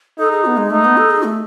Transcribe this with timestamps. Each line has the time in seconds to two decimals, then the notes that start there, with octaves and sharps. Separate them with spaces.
0.19 D#4 A4
0.31 G#4
0.45 B3
0.57 G#3
0.71 A3 D#4
0.84 B3
0.97 A4
1.10 G#4
1.23 A3